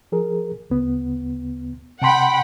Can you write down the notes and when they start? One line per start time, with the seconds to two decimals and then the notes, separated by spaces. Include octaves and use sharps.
0.12 F3 G#4 A#4
0.70 D2 C#3 B3
2.02 C3 F#5 G5 A5 B5 C6